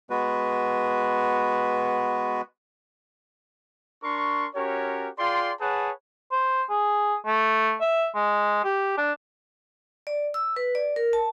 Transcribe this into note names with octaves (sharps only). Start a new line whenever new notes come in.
G#3 B3 F#4 B4
D4 A#4 C6 C#6
C#4 F#4 G4 A#4 C#5
F4 G#4 D5 G5 C6
G#4 B4 C#5 F#5 A5 B5
C5
G#4
A3
E5
G#3
G4
D4
D5
E6
B4
D5
A#4
A5